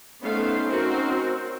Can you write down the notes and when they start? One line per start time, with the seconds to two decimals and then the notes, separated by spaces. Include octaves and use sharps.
0.23 A3 B3 C#4 D#4 C5 F5
0.68 C4 F#4 A#4